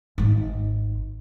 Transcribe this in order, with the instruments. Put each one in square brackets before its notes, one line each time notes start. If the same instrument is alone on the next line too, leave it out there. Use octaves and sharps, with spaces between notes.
[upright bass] G#1 D#2